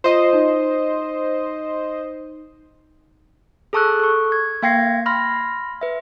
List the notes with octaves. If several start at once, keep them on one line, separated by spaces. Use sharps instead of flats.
F4 C5 D#5
D#4
G#4 A4 A5 C#6 E6 F#6
A4 C#6
G#6
A#3 F5 G5 G#6 A#6 C7
B5 C6 F6 A#6
B4 E5